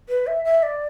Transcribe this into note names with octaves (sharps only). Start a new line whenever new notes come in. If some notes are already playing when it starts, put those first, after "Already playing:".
B4
E5
E5
D5